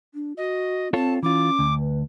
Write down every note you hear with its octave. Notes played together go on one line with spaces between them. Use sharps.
D4
F#4 D#5
C4 F4 A4 C#5 A5
E3 C#4 F4 D6
D2
B4